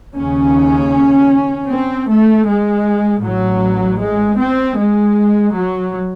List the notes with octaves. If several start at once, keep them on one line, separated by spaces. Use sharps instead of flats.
D#2 C#3 C#4
C4
A3
G#3
A1 A2 F#3
G#3
C4
G#3
F#3